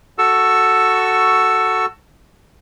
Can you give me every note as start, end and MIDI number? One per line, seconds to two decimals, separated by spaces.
0.18 1.86 66
0.18 1.86 69
0.18 1.86 85
0.18 1.86 88